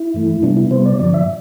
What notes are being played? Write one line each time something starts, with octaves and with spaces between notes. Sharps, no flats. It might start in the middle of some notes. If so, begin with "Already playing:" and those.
Already playing: E4
G2 E3 A3
C3 G3 B3 D4
E4
C3 G3 B3 C5
D5
G2 D3 F3 D5
E5